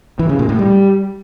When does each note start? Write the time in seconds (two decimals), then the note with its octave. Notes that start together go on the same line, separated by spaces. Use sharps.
0.19 E3
0.29 C#3
0.39 A#2
0.49 A2
0.59 G3